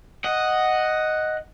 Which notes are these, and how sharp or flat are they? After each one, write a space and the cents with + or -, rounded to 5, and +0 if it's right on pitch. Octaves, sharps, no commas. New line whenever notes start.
D#5 +0 F#5 +0